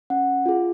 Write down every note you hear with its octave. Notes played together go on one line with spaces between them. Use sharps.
C#4 F#5
F4 G#4